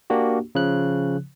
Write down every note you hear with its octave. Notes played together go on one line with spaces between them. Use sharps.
A#3 D4 F#4 G4
C#3 F3 F#6